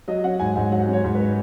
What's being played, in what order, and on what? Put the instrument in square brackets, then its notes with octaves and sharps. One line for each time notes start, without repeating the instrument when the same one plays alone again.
[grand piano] F#3 D#5
C#4 F#5
G#2 G#5
G#2 F#5
F#3 F#5
C#4
C#5
G#2
B4